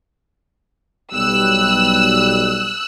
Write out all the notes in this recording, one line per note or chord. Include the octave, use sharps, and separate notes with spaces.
B1 G3 E6 F#6